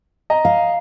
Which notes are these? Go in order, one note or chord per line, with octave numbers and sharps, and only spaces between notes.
D#5 A#5
F5